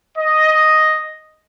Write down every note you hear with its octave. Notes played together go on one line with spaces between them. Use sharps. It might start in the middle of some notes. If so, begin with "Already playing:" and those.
D#5